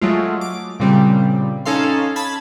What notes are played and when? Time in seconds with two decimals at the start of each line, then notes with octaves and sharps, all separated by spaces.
0.01 F#3 G#3 A3 F4
0.41 D6
0.80 A#2 C#3 G3 C4
1.66 C#4 D#4 A4 F5 C6
2.16 A5 B5 G#6